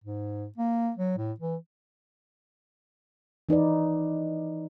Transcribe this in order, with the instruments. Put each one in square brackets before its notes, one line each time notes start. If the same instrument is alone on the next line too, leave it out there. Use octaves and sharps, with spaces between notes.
[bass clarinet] G#2
A#3
F#3
A2
E3
[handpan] E3 D#4 B4 D5